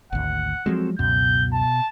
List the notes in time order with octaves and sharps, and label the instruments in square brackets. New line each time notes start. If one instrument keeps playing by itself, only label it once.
[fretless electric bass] G#1 D2 [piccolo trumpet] F#5
[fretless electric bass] F3 F#3 G#3 [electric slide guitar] C4 F#4 A4
[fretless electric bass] C#2 F#2 [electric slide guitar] B2 [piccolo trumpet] G6
[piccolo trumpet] A5